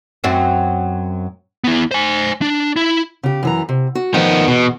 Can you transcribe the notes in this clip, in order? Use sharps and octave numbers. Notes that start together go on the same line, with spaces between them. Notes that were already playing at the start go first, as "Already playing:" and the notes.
F#2 F#3 C4
B3 E4
C5 G#5
D4
E4
C#3 G4
F#2 E3 A#5
C3
F#4
D#3 F3 B3
E2 B2